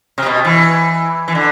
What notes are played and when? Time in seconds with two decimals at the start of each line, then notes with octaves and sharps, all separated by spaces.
0.18 C3
0.26 B2
0.45 E3
1.28 E3
1.35 D3